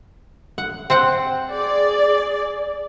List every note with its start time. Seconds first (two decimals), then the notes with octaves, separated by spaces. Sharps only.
0.58 F#5
0.90 C4 C5 F#5
1.50 G#4 D5